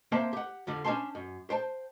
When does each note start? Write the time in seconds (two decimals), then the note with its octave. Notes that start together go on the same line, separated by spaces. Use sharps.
0.12 A#3 C4 C5 E5 G5 A5
0.33 G4 F#5
0.67 F2 D3 G3
0.84 C#4 D4 C#5 G5 A5 C6
1.15 F#2
1.50 C5 G5 A5